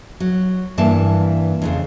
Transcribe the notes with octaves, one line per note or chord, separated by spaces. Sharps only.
F#3
G2 E3 A#3 A5
F2 A2 C#3